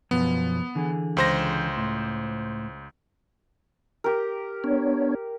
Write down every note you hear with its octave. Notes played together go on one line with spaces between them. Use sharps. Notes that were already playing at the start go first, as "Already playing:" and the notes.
F#2 B2 F3 B3
D3 E3 G#4
C#2 C5 A#6
A2
G4 A#4
B3 D4 C#5